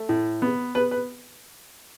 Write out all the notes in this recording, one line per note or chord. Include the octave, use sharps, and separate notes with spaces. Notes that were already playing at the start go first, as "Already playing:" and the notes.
Already playing: A3
A2
B3
B3 B4
B4